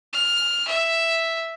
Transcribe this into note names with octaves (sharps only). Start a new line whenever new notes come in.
F6
E5